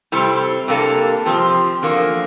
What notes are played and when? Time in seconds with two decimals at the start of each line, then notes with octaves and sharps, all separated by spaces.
0.12 C3 G3 C4 E4 A4
0.68 C3 G3 A#3 D4 A4
1.25 C3 F3 C4 G4
1.82 E2 D3 F3 A#3